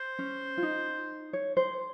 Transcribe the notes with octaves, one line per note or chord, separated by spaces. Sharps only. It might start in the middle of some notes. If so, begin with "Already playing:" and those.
Already playing: C5
C#4
F4
D#4
C#5
C5